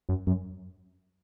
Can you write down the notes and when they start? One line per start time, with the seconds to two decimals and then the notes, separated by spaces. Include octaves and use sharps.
0.09 F#2
0.27 F#2